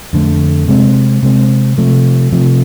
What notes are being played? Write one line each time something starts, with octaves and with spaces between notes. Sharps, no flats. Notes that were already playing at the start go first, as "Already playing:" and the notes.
F2 D3 A3
C3 G#3 C4
C3 G#3 C4
C3 F3 A3
C3 F3 A3